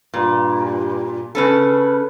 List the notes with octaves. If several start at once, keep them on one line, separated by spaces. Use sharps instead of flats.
G2 A#2
C#3 C#4 A4 B4